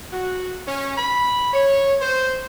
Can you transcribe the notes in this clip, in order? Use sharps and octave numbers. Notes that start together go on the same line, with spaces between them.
F#4
C#4
B5
C#5
C5